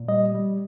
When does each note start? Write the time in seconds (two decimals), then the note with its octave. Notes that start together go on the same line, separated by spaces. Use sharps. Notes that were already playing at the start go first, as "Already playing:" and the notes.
Already playing: A#2
0.08 G3 D#5
0.34 G3